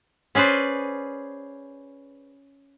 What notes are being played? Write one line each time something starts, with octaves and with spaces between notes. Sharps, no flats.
C#4 G#4 B4 C5 D5